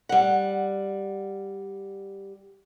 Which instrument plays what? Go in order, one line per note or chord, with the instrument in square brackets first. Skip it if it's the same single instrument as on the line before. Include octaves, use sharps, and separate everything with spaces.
[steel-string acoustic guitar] G3 F#5